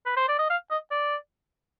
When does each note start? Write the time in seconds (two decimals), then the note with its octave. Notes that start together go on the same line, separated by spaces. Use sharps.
0.06 B4
0.16 C5
0.28 D5
0.39 D#5
0.50 F5
0.71 D#5
0.91 D5